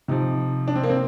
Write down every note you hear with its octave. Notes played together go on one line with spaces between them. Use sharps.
C3 F3 D#4
D4
C4
A#3
C4